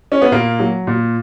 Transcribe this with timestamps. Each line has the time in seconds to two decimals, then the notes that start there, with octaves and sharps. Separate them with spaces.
0.12 C#4
0.21 B3
0.32 A#2 A#3
0.59 F#3
0.87 A#2